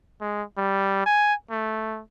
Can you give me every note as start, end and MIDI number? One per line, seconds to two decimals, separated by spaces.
0.21 0.43 56
0.57 1.01 55
1.06 1.34 80
1.50 2.01 57